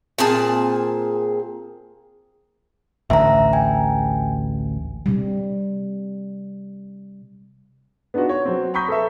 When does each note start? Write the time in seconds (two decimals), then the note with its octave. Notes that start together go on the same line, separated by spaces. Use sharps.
0.18 A#2 C4 G#4 A5
3.10 A1 D2 E5 A#5
3.53 G5 G#5
5.06 C3 G3
8.14 B3 D4 D#4 F4 F#4
8.29 C#5
8.45 F#3 C4
8.74 A#5 B5 C#6 D#6 G6 B6
8.88 A4 B4 E5